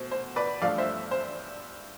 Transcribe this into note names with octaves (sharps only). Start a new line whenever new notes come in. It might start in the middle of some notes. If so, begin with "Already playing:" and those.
Already playing: B2 A3 C5
C5
B4 D5
G2 F3 A3 D4 D5 F5
C5 E5
C5